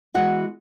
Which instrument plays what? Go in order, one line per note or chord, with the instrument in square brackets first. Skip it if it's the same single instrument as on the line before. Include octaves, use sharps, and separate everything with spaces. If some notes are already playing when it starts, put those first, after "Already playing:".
[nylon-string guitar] E3 G#3 B3 E4 F#4 F#5